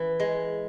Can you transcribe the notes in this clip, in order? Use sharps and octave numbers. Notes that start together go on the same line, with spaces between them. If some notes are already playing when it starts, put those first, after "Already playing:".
Already playing: E3
G#3